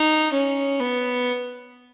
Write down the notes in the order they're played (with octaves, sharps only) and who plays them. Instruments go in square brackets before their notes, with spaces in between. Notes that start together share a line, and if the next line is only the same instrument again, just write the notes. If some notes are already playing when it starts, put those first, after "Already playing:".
Already playing: [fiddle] D#4
C#4
B3